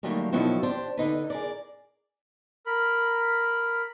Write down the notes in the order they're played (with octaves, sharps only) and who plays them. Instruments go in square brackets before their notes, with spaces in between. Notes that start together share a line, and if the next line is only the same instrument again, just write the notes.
[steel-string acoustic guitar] D3 D#3 F#3 G3 A3 A#3
B2 D#3 F3 F#3 E4 F#4
D4 G4 C5
D3 D#4 B4
G#4 A#4 D5
[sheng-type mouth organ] A#4 B5